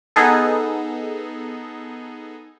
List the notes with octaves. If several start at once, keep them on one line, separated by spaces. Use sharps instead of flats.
B3 D#4 G#4 A4